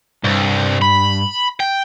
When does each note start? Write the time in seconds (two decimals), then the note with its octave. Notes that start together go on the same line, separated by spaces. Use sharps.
0.24 C2 G2
0.82 B5
1.60 G5